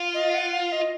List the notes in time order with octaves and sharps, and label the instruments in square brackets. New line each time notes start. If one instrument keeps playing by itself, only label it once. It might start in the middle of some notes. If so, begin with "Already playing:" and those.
Already playing: [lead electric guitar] F4
[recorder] D#5
F5
F#5
F5
D#5